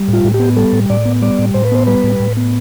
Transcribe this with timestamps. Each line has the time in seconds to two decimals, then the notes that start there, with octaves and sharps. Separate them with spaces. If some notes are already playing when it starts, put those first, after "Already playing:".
Already playing: G3
0.08 A2
0.13 F4
0.24 A2
0.34 G4
0.40 B3
0.57 G3 A4
0.73 A2
0.90 A2 D5
1.05 B3
1.22 G3 D5
1.39 A2
1.54 A2 C5
1.65 B4
1.72 B3 C5
1.87 G3 B4
2.04 A2
2.20 A2
2.37 B3